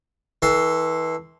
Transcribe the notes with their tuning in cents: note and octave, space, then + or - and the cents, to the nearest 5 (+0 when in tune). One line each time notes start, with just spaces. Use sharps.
E3 -30 A4 +0 C6 +0